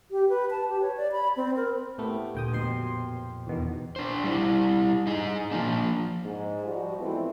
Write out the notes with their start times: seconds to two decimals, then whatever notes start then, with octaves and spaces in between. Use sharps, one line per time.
0.11 G4
0.29 B4
0.50 A5
0.69 G4
0.82 C#5
0.97 D5
1.12 B5
1.37 C4
1.56 A#4
1.98 A2 A3 B3 G4
2.35 D2 A#2 G5 D#6
2.53 F2 B2 C5 C6
3.47 E2 B2 D#3
3.96 D4 C5
4.24 G3 E4
5.07 D#4 G#4
5.52 F3 A#3 D4
6.24 G#2
6.65 F3 G3 F#4
6.99 E3 G#3 A3 B3 C4 E4